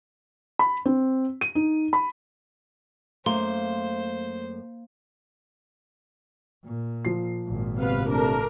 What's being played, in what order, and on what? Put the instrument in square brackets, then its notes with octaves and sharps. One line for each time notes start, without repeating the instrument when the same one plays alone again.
[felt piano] B5
C4
D#7
D#4
B5
[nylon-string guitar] F#2 A3 [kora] A#3 [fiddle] C5 [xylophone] C6
[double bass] A#2
[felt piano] F3 C7
[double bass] G#1 A#2
[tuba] C3 [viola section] B3 B4 F5
[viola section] A3 D4 A#4